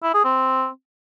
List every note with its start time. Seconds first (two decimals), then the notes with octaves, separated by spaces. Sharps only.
0.03 E4
0.14 G#4
0.25 C4